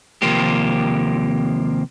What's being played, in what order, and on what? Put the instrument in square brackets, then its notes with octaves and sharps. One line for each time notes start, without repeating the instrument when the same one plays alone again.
[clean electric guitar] D#2 C3 F3 A#3 C4 G4